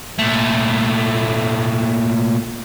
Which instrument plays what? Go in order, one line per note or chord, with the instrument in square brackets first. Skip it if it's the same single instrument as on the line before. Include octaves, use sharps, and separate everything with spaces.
[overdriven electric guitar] A#2 A3